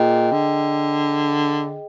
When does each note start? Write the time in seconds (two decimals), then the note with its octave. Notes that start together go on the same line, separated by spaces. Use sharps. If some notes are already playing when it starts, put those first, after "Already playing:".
Already playing: A#2 G#4 D#5 G5
0.32 D3